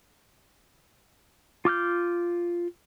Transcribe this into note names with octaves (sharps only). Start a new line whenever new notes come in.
F4 D6 F6 G6